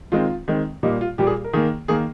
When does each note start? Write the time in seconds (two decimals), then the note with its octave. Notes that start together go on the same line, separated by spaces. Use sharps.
0.12 D#3 G#3 C4 F4
0.48 D#3 G#3 C4
0.83 A#2 G3 A#3 D#4
1.01 F4
1.18 A#2 G3 A#3 G4
1.27 G#4
1.44 A#4
1.53 D#3 A#3 G#4
1.88 D#3 A#3 G#4